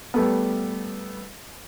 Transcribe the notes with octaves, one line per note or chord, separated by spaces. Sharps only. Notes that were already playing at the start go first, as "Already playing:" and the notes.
G3 A3 B3